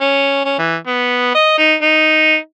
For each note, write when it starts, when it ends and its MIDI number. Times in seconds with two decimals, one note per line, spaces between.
0.01 0.44 61
0.45 0.56 61
0.59 0.76 52
0.87 1.33 59
1.35 1.56 75
1.58 1.75 63
1.82 2.37 63